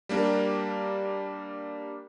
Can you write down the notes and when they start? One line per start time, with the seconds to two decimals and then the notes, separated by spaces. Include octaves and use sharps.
0.09 G3 A#3 D4 G4 A#4